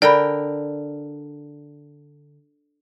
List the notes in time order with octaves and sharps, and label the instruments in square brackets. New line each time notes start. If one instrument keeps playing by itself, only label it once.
[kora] D3 A#4 G5 [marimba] D5 B5